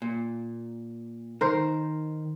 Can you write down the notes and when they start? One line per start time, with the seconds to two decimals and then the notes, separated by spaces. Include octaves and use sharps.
0.02 A#2
1.41 D#3 A#4 C5